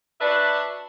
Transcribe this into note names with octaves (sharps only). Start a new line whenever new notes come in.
D4 F#4 B4 D5 E5